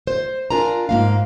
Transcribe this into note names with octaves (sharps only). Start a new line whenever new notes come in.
C5
D4 F4 A#4 D5 G#5 A#5
G#2 A#3 F5